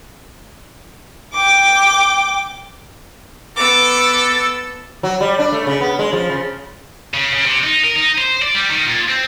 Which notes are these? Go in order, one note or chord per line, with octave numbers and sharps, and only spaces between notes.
G5 D6
B3 A4 D6 E6
F#3
G3
D4
A3
C#3
B3
G#3
F3
C#3
C#3
C#3
C3
D#4
A#4
D#4
C5
D5
G3
D#3
A#2
C4